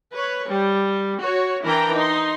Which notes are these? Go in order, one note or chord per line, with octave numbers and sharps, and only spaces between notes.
B4 C#5
G3
F#4 C#5
E3 D4 E4 A#4 G5 A#5
D#4 C6